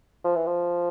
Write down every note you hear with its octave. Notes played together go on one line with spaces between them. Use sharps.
F3
E3
F3